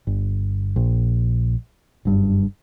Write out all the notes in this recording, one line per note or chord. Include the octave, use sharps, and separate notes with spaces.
G1
A#1
F#1 G2